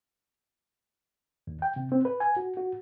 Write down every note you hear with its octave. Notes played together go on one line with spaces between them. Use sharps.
D#2
G5
C3
C4
B4
G#5
F#4
F#4